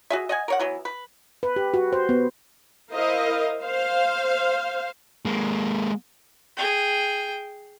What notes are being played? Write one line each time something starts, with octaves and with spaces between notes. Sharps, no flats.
F#4 G#4 E5
D#5 F#5 G#5
A#4 C#5 F#5
E3 F#3 B3
B4
B4
G4
F#4
C5
B3
E4 A#4 C5 D#5 F5
C5 F5
G#3 A#3
G#4 G5